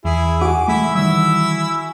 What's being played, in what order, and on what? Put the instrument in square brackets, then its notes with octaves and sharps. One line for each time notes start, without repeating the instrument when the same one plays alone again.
[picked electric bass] E2 [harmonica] E4 G#4
[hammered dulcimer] F#4 G#4 [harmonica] D6
[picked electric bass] E3 G#3 A3 [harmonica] E4 E5
[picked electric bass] D#3 E3 G3 [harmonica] E4 E6